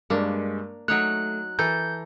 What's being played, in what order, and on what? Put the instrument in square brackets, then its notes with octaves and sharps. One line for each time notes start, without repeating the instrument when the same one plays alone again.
[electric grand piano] G2 G#3 [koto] A#3 D4
[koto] F#3 D#4 C#5 [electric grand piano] A3 [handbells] F#6
[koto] E3 A4 [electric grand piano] A#5 [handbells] G6